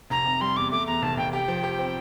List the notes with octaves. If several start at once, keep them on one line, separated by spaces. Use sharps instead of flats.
F1 A#5
C3
G3 C6
E2 D6
A3 D6
E2 A#5
F1 A5
F1 G5
G4 G5
F3
G4
C4